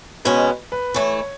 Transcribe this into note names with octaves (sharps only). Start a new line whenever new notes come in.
B2 G#3 C#4 B4
B4
E3 A3 E4 C#5